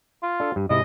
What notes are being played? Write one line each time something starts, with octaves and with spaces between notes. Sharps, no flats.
F4
D4 A4
G2
G#2 C3 E4 D#5